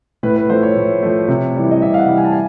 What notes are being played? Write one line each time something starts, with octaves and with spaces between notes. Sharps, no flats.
A2 B4
B4
F3 A3 C5
C#5
A2
F3 A3
C3
E3 G3
D#5
C3 E5
F5
F#5
E3 G3
G#5
A5
G#5